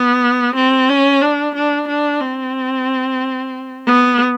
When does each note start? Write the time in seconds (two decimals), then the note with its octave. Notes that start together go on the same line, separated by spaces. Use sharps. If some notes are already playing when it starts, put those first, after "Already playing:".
Already playing: B3
0.56 C4
0.90 C#4
1.22 D4
1.55 D4
1.88 D4
2.21 C4
3.87 B3